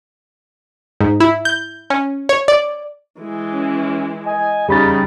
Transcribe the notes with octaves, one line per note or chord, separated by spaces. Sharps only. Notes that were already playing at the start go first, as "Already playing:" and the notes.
G#2
E4
G6
C#4
C#5
D5
E3 G#3
C#4
D#5 G#5
E2 C#3 G3 D#4 B5 A6